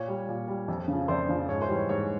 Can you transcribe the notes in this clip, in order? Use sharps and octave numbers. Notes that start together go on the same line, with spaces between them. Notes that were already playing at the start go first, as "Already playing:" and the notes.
Already playing: A#2 C#5
G3
A#2
G3
F2
C#3 F3
F2 C5 D5
C#3 F3
G#2 C#5
C5
E3 G3
C#5
G#2 C#5